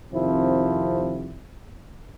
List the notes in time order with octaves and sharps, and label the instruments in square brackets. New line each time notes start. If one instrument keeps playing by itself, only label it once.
[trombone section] F2 C3 D#3 F3 C4 E4